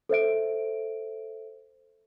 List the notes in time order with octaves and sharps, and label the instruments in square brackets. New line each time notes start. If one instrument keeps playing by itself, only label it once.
[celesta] A4 C5 E5 D7